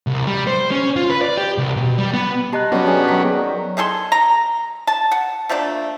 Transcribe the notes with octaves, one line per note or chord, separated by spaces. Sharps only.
C2
G3
C5
C#4
F4
B4
D5
G4
C2
B2
G3
B3
G4 D#5 A5 A#5 F#6
F#3 G3 B3 C#4 D4 F#4
G#4 C5 C#5
D#3 F#3 D6 B6
G#4
D#3 G#4 A4 C6
A#5
A5
F#5
F3 A3 A#3 D4